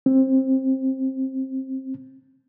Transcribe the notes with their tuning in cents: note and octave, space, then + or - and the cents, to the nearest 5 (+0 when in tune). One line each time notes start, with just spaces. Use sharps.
C4 +15